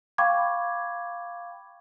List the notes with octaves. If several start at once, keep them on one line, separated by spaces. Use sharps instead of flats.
F5 G5 B5 C#6 D6 G#6